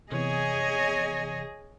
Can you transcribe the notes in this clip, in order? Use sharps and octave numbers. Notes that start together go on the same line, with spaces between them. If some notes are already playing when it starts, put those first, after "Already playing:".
C3 E3 B3 G#4 C#5 D#5 G#5